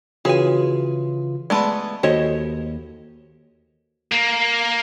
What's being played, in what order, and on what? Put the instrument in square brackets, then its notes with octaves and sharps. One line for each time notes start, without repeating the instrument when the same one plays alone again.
[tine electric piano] C#3 E3 F4 [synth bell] F#4 C#5 C6 [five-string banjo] G#4 G#5
[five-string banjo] G#3 A3 B3 [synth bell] D5 A5 B5
[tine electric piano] D#2 [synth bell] F#4 A4 [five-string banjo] C5 C#5 D#5
[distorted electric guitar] A#3